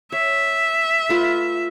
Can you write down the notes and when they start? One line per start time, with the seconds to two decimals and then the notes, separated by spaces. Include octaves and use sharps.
0.12 C#5 E5
1.09 A3 F4 B4